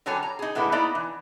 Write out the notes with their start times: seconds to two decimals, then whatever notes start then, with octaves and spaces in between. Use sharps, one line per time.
0.06 D3 F#3 G3 A4 C#5 G#5
0.23 A#5
0.39 D#4 G#4
0.55 A2 D3 G#3 B3 E4
0.72 A#3 B3 D#4 E4 D5
0.95 E3